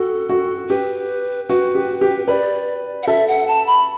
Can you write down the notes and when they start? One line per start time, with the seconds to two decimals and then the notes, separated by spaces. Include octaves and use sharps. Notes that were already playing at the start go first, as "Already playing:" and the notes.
Already playing: F#4 A4
0.29 F#4
0.69 G4 B4
1.49 F#4 B4
1.75 G4
2.01 G4
2.28 B4 D5
3.03 F#5
3.07 A4 E5
3.28 F#5
3.47 A5
3.66 B5